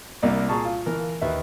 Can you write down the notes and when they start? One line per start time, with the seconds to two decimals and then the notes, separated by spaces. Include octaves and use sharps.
0.22 C2 A#3 D5
0.49 A#2 G#4 A5 C#6
0.65 F4
0.86 E3 A#4
1.21 D#2 B4 E5